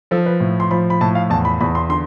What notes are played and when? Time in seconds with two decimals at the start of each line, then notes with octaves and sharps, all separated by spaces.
0.11 F3 A4
0.26 B4
0.40 A2
0.60 C6
0.71 F3 B5
0.90 B5
1.01 A2 A5
1.15 F5
1.30 E2 A5
1.45 B5
1.61 E2 B5
1.75 C6
1.89 D3 C6